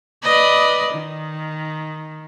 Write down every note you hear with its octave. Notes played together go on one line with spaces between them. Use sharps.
B4 D5 D#5
D#3